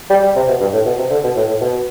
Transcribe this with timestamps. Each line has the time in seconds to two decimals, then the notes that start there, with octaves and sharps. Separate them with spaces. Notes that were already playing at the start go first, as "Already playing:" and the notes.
0.10 G3
0.23 G3
0.36 C3
0.48 B2
0.60 G2
0.73 A2
0.86 B2
0.98 C3
1.10 D3
1.24 B2
1.36 A2
1.48 A2
1.61 B2